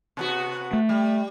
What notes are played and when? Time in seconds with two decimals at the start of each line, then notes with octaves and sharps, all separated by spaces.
0.17 C3 B3 F#4
0.73 A3
0.89 G3